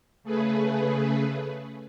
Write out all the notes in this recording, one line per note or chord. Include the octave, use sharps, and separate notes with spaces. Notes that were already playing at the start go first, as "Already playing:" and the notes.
C#3 A3 G#4 B4